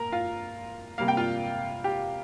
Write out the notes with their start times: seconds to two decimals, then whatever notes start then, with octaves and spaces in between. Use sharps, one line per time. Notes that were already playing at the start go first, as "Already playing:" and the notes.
Already playing: A#2 A#4 A#5
0.12 F4 F5
0.98 C3 G3 A#3 F5
1.08 G5
1.17 F4 F5
1.84 G4